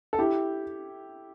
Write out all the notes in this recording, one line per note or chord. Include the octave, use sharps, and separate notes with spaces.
A4
E4 G4